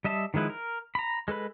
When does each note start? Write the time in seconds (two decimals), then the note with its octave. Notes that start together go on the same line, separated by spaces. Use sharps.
0.05 G3 D#5 E5 A5
0.34 D#3 F3 G#3 E4 B4
0.50 A#4
0.95 A#5 B5
1.28 G#3 A4 B4 B5